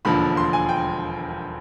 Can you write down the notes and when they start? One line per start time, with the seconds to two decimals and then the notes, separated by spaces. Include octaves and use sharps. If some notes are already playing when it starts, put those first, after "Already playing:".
0.05 E1 D#2 D3 F3 B5
0.37 C6
0.53 G#5
0.69 G5